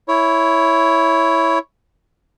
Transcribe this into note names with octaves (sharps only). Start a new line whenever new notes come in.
E4 C#5